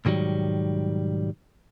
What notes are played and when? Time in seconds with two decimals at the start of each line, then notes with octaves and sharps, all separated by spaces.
0.05 B1 G#2 D#3 F#3 G3